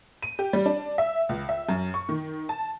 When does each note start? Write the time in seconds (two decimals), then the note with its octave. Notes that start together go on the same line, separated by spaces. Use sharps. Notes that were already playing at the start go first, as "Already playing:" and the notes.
0.22 D#7
0.39 G4
0.53 G3
0.66 D4
0.98 E5
1.29 C#2
1.49 E5
1.69 F#2
1.94 C#6
2.09 D#3
2.49 A5